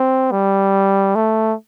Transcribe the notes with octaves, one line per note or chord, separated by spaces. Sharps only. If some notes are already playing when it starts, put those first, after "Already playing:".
Already playing: C4
G3
A3